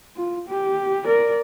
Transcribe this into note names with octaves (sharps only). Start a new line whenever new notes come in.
F4
G4
A#4 D5